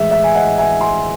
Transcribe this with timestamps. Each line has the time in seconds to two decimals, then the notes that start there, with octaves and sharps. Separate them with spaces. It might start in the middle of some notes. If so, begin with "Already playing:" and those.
Already playing: A2 E3 G#3 E5
0.11 E5
0.24 G#5
0.35 D#5 F#5
0.58 E5 G#5
0.80 G#5 C6